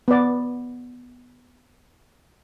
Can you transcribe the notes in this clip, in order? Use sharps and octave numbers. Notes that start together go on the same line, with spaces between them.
B3 D5